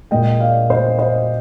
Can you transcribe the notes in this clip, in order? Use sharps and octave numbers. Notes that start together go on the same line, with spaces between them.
A#2 G#3 D#5 G5
D5 F5
C5 D#5
C5 D#5